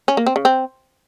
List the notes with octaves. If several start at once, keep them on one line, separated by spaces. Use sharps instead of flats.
C#4
A#3
C4
C#3
C4